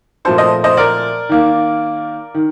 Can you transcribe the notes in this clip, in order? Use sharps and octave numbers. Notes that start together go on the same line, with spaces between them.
A#2 F3 A3 C4 A4 C5
C5 D#5
C5 D#5
A#4 D5
D#3 A#3
D#3